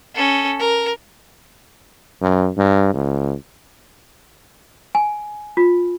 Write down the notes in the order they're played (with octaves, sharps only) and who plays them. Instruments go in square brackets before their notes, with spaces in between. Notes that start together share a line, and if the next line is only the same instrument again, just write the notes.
[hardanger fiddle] C#4 A4
A#4
[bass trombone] F#2
G2
C#2
[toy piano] G#5
F4